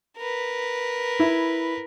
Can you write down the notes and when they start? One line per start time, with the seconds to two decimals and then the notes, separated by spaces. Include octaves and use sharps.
0.18 A#4 B4
1.20 E4